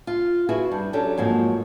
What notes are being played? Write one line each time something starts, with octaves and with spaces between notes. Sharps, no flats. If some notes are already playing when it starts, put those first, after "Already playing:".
F4
E4 F#4 G#4 B4
G2
F#3 C#4 D4 G4 A4
F2 G#2 F#3 A#3